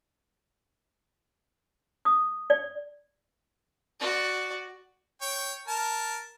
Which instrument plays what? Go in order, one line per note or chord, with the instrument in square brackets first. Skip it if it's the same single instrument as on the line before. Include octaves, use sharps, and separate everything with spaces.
[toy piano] D#6
D5
[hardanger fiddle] F#4 D5
[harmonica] C#5 G5
A#4 A5